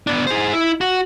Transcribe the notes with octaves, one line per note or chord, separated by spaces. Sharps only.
B3 D4
G#4 C5
E4
F#4